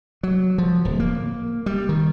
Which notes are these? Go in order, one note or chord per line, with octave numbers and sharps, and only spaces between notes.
F#3
F3
D1
A#3
G3
D#3